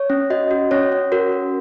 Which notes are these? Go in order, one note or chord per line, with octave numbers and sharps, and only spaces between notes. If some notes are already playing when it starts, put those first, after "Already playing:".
Already playing: C#5
C#4
F#4 D#5
F#4
C#4 C#5
C#4
F#4 A#4
F#4